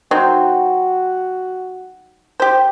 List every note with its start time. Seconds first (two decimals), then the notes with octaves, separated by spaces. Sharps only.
0.11 F#3 C4 D#4 F#4
2.40 G4 C5